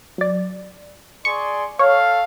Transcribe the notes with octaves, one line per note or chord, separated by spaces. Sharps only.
F#3 D5
G#4 D5 C6 C#6
A4 C#5 F5